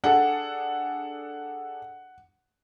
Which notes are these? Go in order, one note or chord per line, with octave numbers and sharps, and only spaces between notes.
D4 G#4 A4 F#5